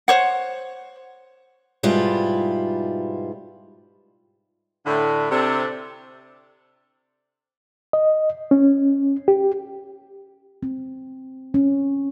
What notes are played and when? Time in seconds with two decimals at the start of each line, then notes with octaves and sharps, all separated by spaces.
0.08 C5 C#5 F#5
1.83 G#2 B2 G3 E4 F4
4.86 A2 D3
5.31 C3 D4 A4
7.93 D#5
8.51 C#4
9.28 G4
10.63 C4
11.54 C#4